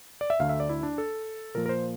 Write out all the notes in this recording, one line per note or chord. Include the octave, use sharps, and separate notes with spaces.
D5
E5
D2 D3 A3 F5
E5
D5
E4
D4
A4
A#2 F3 A#3 A#4
A#4
C5